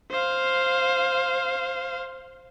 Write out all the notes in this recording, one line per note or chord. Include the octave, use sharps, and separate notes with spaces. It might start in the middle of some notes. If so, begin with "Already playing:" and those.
C5 F5